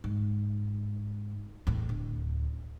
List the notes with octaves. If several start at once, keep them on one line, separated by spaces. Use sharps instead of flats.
G#2
E2 A2
D1